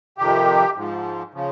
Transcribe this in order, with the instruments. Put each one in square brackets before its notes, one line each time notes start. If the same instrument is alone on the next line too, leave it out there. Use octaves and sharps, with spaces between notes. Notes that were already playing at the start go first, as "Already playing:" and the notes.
[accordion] F2 C3 D#3 G4
G#2 F3
C#3 F3